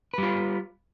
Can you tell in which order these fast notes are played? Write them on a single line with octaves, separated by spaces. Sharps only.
B4 G3 F4